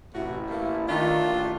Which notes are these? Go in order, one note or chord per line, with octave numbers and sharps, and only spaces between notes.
A1 A2 C3 E4 F#4
A3 A#3
D#3 A3 D4 F4
A1